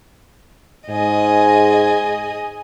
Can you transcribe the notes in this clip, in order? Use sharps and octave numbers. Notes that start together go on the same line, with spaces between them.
G#2 G#4 D#5